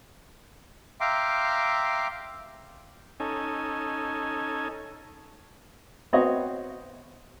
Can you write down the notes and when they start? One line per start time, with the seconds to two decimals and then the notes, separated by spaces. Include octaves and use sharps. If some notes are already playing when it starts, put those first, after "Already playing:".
1.01 E5 F5 G5 A#5 C6 D6
3.20 C#4 D#4 A4 G#5
6.13 B3 C4 F#4 C#5 D#5